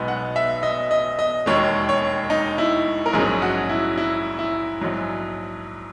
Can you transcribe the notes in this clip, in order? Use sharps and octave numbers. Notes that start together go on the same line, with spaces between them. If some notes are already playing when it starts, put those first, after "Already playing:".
Already playing: B1 B2 G#3 B3 D#4
F#5
E5
D#5
D#5
D#5
E1 D#2 D#3 G#3 C#5
C#5
D#4
E4
A#4
A#1 G#2 F#3 C#4 G#4
F#4
E4
E4
E4
A#1 G#2 F#3